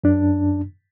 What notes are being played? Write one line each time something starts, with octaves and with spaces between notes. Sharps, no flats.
F#2 D4